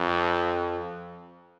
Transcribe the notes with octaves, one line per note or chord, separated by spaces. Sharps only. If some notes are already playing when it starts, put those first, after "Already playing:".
Already playing: F2